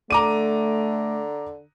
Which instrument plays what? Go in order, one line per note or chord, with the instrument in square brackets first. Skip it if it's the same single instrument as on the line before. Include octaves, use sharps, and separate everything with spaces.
[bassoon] D3 [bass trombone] A3 [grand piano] A#5 D6 D#7